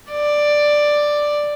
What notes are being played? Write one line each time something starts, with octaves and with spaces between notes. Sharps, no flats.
D5